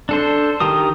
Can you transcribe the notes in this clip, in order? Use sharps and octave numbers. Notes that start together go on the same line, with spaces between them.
D4 A4 C5
D#3 G4 A#4 D#6